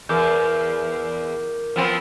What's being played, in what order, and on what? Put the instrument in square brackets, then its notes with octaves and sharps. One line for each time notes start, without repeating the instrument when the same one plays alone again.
[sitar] E2 [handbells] A#4 D6 G6
[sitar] F3 B3 C4